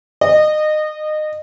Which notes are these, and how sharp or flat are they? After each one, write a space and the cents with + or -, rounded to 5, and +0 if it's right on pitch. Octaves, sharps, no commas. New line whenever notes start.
D#5 -25